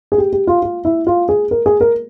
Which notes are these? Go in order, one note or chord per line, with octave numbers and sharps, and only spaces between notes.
G#4
G4
G4
F4
F4
E4
F4
G#4
A#4
G#4
A#4